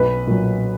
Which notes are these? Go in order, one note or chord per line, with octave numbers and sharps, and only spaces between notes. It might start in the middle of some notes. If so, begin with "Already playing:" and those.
Already playing: B1 B4
A#2 F#3